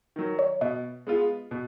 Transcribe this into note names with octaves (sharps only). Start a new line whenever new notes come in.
D#3 F#3
C#5
B2 D#5
G#3 B3 F4
B2